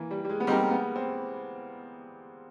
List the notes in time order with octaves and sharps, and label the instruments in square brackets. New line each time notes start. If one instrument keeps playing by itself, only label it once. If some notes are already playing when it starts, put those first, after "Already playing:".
Already playing: [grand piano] E3 A#3
G3
G3
G#3
B3
[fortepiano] G3 C4 D#4 G4 A#4 [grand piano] A#3
[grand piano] B3
C4